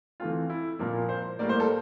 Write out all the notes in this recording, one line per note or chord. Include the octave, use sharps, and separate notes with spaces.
E3 A3 C4 F4
E4
A#2 F3 A#3
C5
A2 G3 A#3 D5
C5
A4